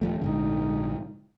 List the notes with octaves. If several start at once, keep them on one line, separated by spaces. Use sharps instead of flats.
D#1 F3 A3
A#1 G#2 D3 D#4